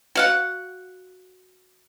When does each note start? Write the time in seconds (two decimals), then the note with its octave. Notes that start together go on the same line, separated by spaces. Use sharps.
0.15 F#4 F5 F#5